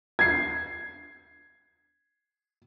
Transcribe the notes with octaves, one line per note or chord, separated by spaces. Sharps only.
G#6 C7